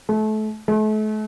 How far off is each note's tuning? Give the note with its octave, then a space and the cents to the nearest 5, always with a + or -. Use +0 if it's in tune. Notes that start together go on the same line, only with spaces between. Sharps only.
A3 -30
A3 -40